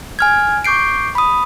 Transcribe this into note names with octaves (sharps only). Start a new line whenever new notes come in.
G#5 F6 G#6
C#6 D6 G6 C7 D7
B5 D#6